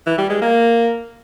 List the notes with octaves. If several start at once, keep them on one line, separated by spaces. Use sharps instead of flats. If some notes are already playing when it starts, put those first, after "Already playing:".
E3
G3
G#3
A#3